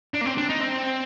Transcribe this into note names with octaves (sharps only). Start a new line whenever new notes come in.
D4
A#3
C4
D4
D#4
C4